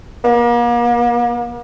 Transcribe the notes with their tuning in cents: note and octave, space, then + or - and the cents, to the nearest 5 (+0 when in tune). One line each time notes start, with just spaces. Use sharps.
A#3 +40